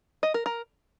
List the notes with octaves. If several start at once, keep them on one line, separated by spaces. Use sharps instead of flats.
D#5
A#4
A#4